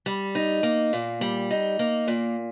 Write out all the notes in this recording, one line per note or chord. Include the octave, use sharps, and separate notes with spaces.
G3
D#4
A#3
A#2
G3
D#4
A#3
A#2